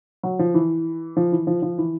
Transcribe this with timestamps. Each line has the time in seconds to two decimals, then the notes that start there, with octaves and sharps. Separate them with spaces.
0.23 F#3
0.39 F3
0.54 E3
1.17 F3
1.32 E3
1.47 F3
1.62 F3
1.78 E3